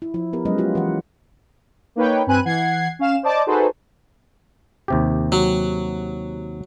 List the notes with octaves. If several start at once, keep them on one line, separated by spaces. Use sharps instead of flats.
E4
F3 E4
B3 G4 A#4 B4
F#3 G#3 C#4 B4 D#5
G#3 F4 G4
E3 B4 F#5
A#3 D#4 B4 C#5 G5
G2 C4 B4 G#5 F#6 D#7
E3 F#5 G#6 C7
C#4 F5 E7
C5 D5 D#5 A5 D6
D#4 F#4 G#4 A4 B4 C5
D#2 C3 G4
F#3